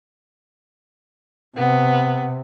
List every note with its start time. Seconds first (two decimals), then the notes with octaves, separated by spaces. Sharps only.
1.57 C3 B3